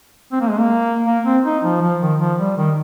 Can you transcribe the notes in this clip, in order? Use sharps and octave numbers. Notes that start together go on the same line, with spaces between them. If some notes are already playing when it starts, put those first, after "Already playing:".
C4
A#3
G#3
A#3
A#3
C4
D#4
F3
F3
D#3
F3
G3
D#3